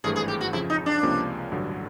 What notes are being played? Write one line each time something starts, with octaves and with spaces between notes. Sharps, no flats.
G#1 G2 E3 A3 G#4
G#4
G4
F#4
F2 C#3 F3 E4
D#4
D4
C#2 C3 F3 A#3 C#4
A1 G2 D3 F#3